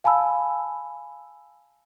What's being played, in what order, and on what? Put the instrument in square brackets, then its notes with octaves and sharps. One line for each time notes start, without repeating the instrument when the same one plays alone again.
[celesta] F5 G#5 A5 B5 E6